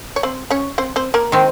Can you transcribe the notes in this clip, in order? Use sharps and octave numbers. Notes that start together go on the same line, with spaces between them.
C#5
C4 C5
C#4 C#5
C4 C5
C4 C5
A#3 A#4
D#3 G#3 C4